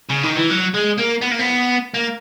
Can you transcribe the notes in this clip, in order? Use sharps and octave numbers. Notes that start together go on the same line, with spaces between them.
C#3
D#3
E3
F#3
G#3
A#3
B3
A#3
B3
A#3